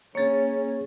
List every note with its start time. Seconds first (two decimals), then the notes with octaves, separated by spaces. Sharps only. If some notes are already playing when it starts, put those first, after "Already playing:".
0.15 A#3 C#4 G#4 C#5 A6